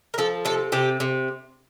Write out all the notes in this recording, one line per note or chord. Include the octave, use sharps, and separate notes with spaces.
A#4
F3 A4
C3 A4
C3 G4
C3